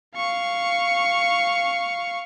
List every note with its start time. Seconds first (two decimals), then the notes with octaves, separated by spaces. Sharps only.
0.15 F5 C#6